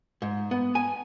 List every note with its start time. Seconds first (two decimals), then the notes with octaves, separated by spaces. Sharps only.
0.22 G#2
0.51 B3
0.75 G#5